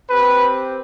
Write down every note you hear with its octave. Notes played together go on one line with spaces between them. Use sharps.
C4 G4 B4